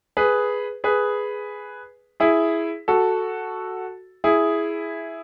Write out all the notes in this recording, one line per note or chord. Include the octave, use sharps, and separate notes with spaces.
G#4 B4
G#4 B4
E4 G#4
F#4 A4
E4 G#4